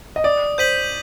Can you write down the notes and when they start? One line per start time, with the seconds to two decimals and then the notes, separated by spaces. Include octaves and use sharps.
0.16 D#5
0.24 D5 D#6
0.58 C5 G6 B6 D#7 F#7